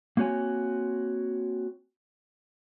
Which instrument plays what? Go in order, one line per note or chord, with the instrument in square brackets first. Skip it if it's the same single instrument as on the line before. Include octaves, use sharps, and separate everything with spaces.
[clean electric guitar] A#3 C4 F#4 C#5 G#5